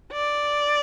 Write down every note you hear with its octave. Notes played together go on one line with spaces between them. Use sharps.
D5